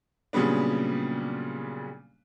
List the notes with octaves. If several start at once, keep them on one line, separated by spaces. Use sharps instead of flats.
A#2 C#3 F#3 G3 B3 D4